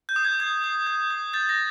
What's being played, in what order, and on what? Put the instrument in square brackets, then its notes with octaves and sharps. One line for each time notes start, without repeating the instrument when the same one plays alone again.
[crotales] G6
D#6
G#6
D#6 G#6
D#6
G6
D#6
G6 A6
A#6